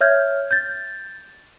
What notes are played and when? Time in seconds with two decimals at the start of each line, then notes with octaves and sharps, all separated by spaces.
0.01 C#5 E5 F6 G6 G#6
0.51 G6 A6